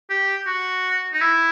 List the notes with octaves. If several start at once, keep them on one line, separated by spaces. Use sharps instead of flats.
G4
F#4
D#4
E4